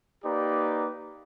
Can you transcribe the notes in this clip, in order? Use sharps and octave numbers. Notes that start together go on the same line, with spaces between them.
A#3 D#4 G4 B4 D5